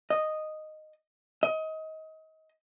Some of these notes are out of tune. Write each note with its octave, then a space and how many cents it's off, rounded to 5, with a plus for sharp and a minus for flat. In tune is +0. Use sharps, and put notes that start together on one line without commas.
D#5 -5
D#5 +25